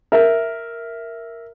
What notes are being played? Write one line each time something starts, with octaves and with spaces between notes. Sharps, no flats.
A#4 E5